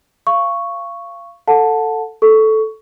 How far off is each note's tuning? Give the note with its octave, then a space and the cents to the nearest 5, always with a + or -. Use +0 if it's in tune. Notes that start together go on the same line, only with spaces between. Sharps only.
F5 -25 C#6 +0
A4 +10 F#5 -25 A5 +0
A4 -10 C#6 +15